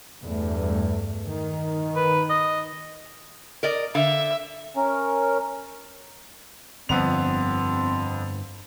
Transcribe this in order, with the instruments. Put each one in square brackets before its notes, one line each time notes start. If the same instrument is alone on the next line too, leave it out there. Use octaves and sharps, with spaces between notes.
[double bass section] E2 G2 A3
D#3
[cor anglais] B4
D#5
[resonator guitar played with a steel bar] A#4 D5 D#5
[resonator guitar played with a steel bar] D3 F5 [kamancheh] E5
[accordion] C#4 A#4
[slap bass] G1 [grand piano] F2 B3 F7 [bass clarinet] C4